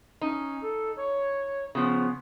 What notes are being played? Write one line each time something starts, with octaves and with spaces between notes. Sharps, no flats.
C#4 D#4
A4
C#5
C#3 F3 B3